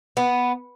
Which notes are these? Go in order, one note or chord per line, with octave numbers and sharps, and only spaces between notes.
B3